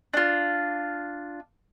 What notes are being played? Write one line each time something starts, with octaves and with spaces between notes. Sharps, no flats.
D4 F4